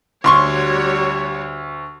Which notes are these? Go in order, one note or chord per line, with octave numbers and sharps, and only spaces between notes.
D2 G3 F#4 C#5 C6 C#6